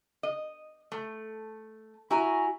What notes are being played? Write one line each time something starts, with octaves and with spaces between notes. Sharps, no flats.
D#5
A3
E4 F#4 G#5 A#5